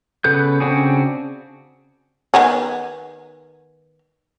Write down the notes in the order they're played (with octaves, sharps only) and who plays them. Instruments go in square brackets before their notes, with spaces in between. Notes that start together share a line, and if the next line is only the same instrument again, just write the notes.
[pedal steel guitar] C#3 B3 A4 F#6 G6
C#3 C4 D4 F#4 G#4
[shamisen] D#3 B3 G#4